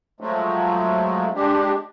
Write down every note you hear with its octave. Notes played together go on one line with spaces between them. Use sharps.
F3 F#3 G#3 A3
G#3 D4 G4